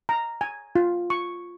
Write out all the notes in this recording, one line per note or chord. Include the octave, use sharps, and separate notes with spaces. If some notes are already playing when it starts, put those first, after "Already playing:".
A#5
G#5
F4
C#6